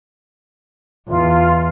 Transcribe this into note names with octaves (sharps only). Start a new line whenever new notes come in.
E2 F4